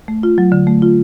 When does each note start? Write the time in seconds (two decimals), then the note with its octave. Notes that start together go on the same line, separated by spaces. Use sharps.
0.08 A3
0.23 F4
0.38 F#3
0.52 D3
0.67 A3
0.82 F4